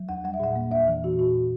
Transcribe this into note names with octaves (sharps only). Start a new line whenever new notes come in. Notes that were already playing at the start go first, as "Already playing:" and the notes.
Already playing: F#3
E2 F#5
G3 F#5
E5
A#2 F#5
A#3
E2 E5
E3
A#2 F#4
A#2 F#4